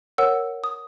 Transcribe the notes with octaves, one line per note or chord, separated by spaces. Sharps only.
A#4 C#5 F#5 E6
D#6